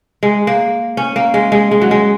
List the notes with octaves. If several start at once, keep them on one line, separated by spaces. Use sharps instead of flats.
G#3
A#3
C#4
A#3
G#3
G#3
G#3
F#3
G#3